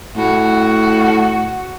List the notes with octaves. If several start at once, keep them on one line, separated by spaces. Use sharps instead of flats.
A2 F#4